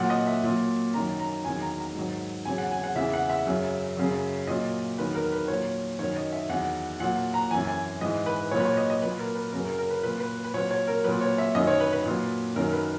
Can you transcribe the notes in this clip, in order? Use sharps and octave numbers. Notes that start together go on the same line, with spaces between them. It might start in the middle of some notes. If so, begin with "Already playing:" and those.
Already playing: A#2 F#3 F#5
D#5
E5
A#2 F#3
F#2 D#3 F#3 A#5
A#5
E2 D#3 F#3 G#5
A#5
A#5
G#2 D#3 F#3
E2 C#3 F#3 G#5
F#5
G#5
F#5
E2 C#3 E3 E5
F#5
E5
F#2 C#3 F#3
F#2 C#3 F#3
A#2 F#3 D#5
E2 D#3 F#3 B4
A#4
B4
A#2 F#3 C#5
F#2 D#3 F#3 C#5
D#5
E5
E2 D#3 F#3 F#5
A#2 F#3 F#5
A#5
F#2 E3 G#5
G#5
G#2 E3 D#5
B4
A#2 F#3 C#5
B4
C#5
D#5
D#5
A#2 F#3 B4
A#4
B4
F#2 C#3 F#3 A#4
A#4
A#4
B4
A#2 F#3 B4
B4
B4
A#2 F#3 C#5
C#5
A#4
A#2 F#3 B4
C#5
E5
F#2 D#3 F#3 D#5
C#5
B4
B4
A#2 F#3
F#2 D#3 F#3 A#4
B4